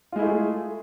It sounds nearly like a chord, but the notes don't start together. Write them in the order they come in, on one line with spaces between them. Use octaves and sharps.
F4 G#3 E4 A3 G#4